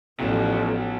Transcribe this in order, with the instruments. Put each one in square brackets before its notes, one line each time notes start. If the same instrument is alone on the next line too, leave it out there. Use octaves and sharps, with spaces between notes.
[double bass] A1 F3 [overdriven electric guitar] B2 F#3